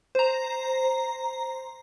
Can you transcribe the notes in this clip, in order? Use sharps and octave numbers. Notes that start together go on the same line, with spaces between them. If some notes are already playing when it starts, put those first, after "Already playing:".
C5 A#5